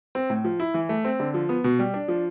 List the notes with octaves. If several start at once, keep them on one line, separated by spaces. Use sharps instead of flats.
C4
A2
F3
E4
E3
A3
C4
D3
F3
B3
B2
G3
D4
F3